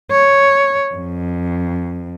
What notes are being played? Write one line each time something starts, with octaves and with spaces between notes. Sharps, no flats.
C#5
F2